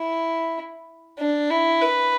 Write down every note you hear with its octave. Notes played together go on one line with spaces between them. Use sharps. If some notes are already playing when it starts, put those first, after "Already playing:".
Already playing: E4
D4
E4
B4